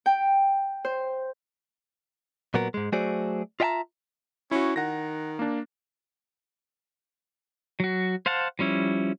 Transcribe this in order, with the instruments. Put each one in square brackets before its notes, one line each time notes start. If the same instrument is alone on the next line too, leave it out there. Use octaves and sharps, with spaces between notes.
[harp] G5
C5
[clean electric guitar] A#2 F#3 B3 A#4
G#2 G#3
F#3 A3 F#4 G#4 C5 D5
F4 D#5 E5 G5 A5 A#5
[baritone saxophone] C#4 [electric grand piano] E4 F#4
[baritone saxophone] D#3 [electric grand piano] F#5 A#6
[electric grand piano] A#3 D4
[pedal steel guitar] F#3 F#4
C5 F5 F#5 A5
F3 G3 C#4 E4